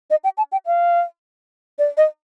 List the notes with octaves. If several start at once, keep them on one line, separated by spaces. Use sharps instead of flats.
D#5
G5
A5
G5
F5
D5
D#5